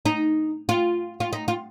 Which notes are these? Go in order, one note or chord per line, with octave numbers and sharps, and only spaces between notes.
D#4
F4
F4
D#4
F4